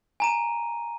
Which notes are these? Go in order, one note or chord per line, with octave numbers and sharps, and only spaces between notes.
G#5 A#5 D#7